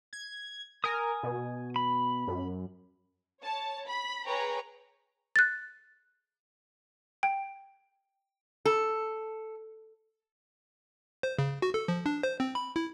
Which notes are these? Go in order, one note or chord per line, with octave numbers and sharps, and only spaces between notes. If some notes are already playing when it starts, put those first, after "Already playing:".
G#6
A#4 G#5 D#6
B2
B5
F#2
C#5 A5
B5
G#4 B4 C#5 G5 A#5
F#6 A6
G5
A4
C5
C#3
F#4
A4
F3
D4
C5
C4
B5
E4